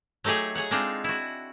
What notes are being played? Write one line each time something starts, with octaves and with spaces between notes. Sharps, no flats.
F#3 A3 D#4 G4 G#4
G#4 C#5 F#5
G#3 C4 D4 D#4 F4
E4 F#4